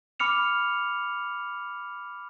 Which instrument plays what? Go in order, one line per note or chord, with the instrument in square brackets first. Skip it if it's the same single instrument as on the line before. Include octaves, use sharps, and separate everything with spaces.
[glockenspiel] B5 D6 F6 C#7 F7